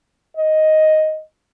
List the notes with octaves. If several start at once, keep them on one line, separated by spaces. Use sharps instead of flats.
D#5